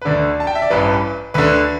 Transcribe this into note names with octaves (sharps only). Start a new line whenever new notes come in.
B4
D2 D3 D5
A5
G5
E5
D5
A1 G2 E3 B4
D2 D3 B4